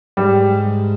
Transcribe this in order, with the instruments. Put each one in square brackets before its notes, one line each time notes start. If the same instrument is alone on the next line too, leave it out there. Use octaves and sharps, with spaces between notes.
[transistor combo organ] G#2 [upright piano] G3